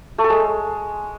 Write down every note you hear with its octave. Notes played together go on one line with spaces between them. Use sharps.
A3
A4
G#3